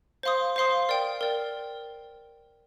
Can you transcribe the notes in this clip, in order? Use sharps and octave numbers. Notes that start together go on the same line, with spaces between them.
C5 F5 C6 D#6
C5 F5 C6 D#6
A#4 D5 G5
A#4 D5 G5